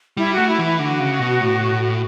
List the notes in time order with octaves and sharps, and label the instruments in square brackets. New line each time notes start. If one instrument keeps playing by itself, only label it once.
[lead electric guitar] G3 [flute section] E4
[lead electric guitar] A3 [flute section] F#4
[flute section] E4
[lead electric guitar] E3
[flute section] E4
[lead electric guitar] D3 [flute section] F#4
[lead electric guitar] C#3
B2
A2